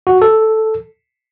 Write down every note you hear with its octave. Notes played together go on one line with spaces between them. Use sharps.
F#4
A4